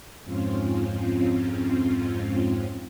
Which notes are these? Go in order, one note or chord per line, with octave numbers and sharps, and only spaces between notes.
F2 G#2 C4 C#4 F4